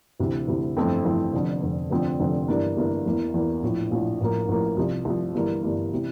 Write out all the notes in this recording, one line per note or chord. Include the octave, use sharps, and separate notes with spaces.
D2 C3 E3
D2 C3 E3
G1 F2 E3 A3 C4
G1 F2 E3 A3 C4
F1 F2 D3
F1 F2 D3
F1 F2 D3 F3 C4
F1 F2 D3 F3 C4
G1 G2 E3 A#3 D4
G1 G2 E3 A#3 D4
E2 E3 A#3
E2 E3 A#3
A#1 A2 F3
A#1 A2 F3
A1 A2 F3 A#3
A1 A2 F3 A#3
C2 C3 F3
C2 C3 F3
G1 G2 E3 A#3
G1 G2 E3 A#3
C3 E3